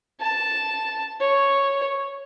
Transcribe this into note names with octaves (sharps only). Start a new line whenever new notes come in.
A5
C#5